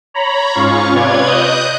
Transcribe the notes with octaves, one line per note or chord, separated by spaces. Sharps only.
C#5 A#5 B5
G#2 C#4 F4 F5 C#6
C3 F4 B4 C#5 D5 G#6
D#5 D#6 F#6 G6